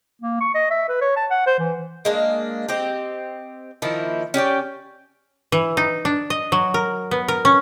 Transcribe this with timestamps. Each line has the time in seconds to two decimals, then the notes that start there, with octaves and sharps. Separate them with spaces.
0.22 A#3
0.41 C#6
0.55 D#5
0.71 E5
0.89 B4
1.01 C#5
1.17 A5
1.30 F#5
1.46 C5
1.59 E3
2.05 G#3 A#3 D4
2.69 C4 G4 D#5
3.82 D#3 F3 A#3 E4
4.34 C#4 G4 D5 G5
5.52 E3
5.77 D#4
6.05 D4
6.30 D#5
6.52 F#3
6.74 A#4
7.11 B3
7.28 A#4
7.45 C#4